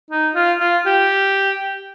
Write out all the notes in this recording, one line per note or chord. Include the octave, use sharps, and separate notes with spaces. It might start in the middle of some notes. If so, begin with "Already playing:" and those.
D#4
F4
F4
G4